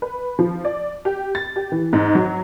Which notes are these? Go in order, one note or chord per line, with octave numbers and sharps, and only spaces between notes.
B4
F3
D5
G4
A6
G4
E3
G#2
F#3